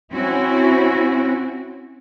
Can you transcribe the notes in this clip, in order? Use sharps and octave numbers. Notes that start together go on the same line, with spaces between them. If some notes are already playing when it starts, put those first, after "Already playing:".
C4 C#4 E4 F#4